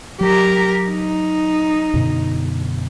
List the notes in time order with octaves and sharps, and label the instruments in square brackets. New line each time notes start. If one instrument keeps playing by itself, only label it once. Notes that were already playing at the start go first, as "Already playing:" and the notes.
[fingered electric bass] F#3 [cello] G4 A#4
[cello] D#4
[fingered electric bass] F#2 B2 D3